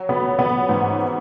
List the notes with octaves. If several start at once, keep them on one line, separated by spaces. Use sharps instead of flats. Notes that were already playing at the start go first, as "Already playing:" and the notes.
Already playing: F#3
B3
B3
G#2